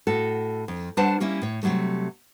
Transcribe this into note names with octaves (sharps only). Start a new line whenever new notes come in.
A2 F#4 A4
F2
G3 D4 B4 C5 F#5 A5
G3 A#3 C#4 E4
A2 C#5
C3 E3 F#3 G3 A3